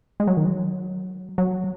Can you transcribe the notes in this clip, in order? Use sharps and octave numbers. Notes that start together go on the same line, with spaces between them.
G#3
F#3
D#3
F#3
F#3